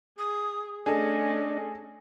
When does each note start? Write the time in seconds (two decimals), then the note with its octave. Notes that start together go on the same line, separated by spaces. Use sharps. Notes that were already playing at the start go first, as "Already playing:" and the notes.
0.19 G#4 D#6
0.86 A3 C#4 D4 G#4 A4 D#5